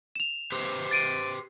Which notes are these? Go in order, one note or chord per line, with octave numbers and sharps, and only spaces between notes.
E7 F7
G4 B4 C5
A6 D7 D#7